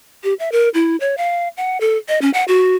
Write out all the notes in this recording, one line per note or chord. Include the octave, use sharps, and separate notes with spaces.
G4
E5
A#4
E4
C#5
F5
F#5
A4
D#5
C#4
F#5
F#4